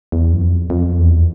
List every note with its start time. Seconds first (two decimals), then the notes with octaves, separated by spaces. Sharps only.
0.12 E2
0.33 F#2
0.41 F2
0.70 F2
0.99 E2